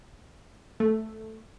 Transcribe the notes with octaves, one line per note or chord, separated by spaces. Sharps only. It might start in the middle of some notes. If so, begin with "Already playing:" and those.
A3